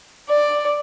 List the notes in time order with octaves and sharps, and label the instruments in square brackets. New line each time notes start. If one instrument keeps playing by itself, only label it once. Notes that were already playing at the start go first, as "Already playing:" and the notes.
[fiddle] D5